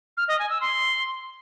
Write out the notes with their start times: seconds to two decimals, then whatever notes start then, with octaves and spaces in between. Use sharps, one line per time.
0.17 F6
0.28 D#5
0.39 G#5
0.50 E6
0.61 C6